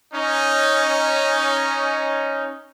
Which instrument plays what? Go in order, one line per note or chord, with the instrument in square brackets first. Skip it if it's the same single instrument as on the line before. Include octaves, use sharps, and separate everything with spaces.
[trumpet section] C#4 D#4